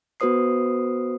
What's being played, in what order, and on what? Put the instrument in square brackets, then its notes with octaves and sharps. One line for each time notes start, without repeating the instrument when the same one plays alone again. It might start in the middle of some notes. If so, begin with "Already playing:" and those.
[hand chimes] B3 F#4 B4 C5 D#6 C7